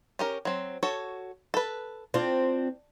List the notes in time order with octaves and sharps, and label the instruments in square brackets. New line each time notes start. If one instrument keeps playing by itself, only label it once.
[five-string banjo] C#4 G4 A#4
F#3 C4
F#4 A4 C#5
A4 B4
[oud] C4 F4 [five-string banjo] D4